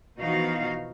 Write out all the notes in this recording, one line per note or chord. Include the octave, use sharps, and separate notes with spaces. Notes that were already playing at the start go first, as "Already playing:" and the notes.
B2 E3 F3 D#4 F#4 F5